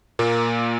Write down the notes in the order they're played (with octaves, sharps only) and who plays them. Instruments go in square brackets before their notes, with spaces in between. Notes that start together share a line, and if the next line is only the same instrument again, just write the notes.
[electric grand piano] A#2 A#3